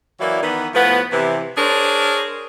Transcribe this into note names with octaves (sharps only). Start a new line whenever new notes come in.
E3 F#3 A#3 E4 D5
D#3 E3 B3
A2 F3 B3
C3 E3
D4 G#4 A#4 C5 C#5